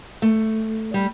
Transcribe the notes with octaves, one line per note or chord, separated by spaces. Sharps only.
A3
G3